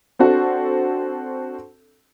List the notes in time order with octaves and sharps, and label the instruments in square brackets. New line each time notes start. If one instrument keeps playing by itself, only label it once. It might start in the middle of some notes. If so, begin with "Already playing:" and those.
[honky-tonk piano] C4 D4 F#4 A4